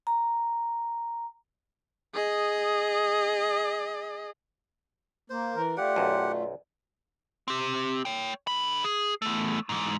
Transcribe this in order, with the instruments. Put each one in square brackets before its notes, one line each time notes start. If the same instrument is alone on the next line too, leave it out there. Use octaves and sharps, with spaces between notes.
[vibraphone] A#5
[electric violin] G#4 D#5
[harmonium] A#3 [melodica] C5
[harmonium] E3 A#4
[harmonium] A3 F4 [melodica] G4 F#5 [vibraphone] D5
[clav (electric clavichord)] B1 F#2
[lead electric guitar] C4 G4
C#5 G5
D3 B5
G#4
E2 A3
G#2 E3